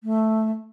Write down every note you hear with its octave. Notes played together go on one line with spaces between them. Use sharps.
A3